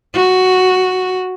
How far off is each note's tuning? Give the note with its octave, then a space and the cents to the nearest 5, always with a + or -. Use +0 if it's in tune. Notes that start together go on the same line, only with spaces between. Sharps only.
F#4 +0